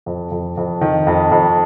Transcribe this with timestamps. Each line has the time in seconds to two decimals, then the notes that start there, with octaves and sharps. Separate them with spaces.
0.06 F2
0.31 F2
0.57 F2
0.81 D#3
1.07 F2
1.31 F2